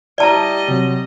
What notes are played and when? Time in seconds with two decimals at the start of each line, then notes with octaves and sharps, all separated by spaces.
0.18 G3 E4 D5 D#5 A5 A#5
0.68 C3 F#3 C4